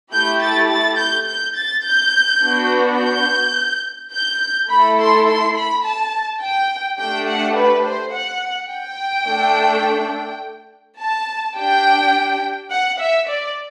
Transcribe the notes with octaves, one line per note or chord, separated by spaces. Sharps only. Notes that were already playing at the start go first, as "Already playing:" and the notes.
A3 E4 G4 G6
A6
A6
G6
G6
A6
G6
B3 D4 F#4
G6
G6
A3 E4 A4 B5
C6
C6
B5
A5
G5
A3 D4 G4 G5
F#5
B4
C5
F#5
G5
A3 D4 A4
A5
D4 G4 G5
F#5
E5
D5